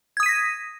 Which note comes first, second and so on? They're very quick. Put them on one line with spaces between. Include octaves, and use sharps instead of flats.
G#6 D#6 D#7 B6 A#6